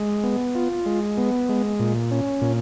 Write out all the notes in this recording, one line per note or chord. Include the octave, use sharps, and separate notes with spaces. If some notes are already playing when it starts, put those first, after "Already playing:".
Already playing: G#3
B3
F4
G#3
B3
G#3
A#2
C#4
A#2